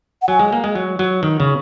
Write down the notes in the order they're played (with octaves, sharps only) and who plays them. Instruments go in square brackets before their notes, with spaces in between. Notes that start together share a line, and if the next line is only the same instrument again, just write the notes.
[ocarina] F#5
[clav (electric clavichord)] F#3 [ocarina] G#5
[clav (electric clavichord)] G#3
A#3
G#3
F#3
F#3
D#3
C#3